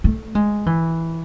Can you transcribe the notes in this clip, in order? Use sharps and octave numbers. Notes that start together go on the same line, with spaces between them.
A3
G#3
E3